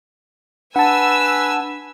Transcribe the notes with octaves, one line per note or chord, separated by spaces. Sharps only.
D4 B4 F#5 G#5 A5 E6